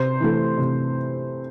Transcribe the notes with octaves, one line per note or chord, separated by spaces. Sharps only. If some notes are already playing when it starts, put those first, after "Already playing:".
Already playing: C3 C5
E3 A3
C3